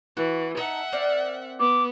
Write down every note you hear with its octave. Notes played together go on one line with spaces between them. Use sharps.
E3 F#4
D#4 E5 F#5 A5
C4 A#4 D5
B3 D6